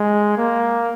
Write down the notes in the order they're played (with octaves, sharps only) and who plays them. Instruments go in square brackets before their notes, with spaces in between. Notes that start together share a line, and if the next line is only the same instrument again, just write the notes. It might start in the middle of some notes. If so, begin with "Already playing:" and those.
Already playing: [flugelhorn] G#3
A#3